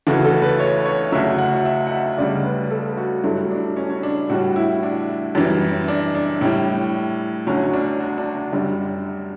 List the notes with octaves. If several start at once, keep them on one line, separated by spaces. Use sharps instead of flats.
D2 C#3 E3 A3 F#4
A4
B4
C#5
C#5
D2 C#3 F#3 E5
F#5
E5
F#5
E5
D2 C#3 G3 D5
B4
A4
F#4
G2 F#3 A3 E4
D4
C#4
C#4
D4
A2 G3 F#4
E4
D4
F#2 E3 G3
D4
D4
A2 G3 E4
D2 D3 F#3 C#4
D4
F#4
D4
D4
F#2 D3 G3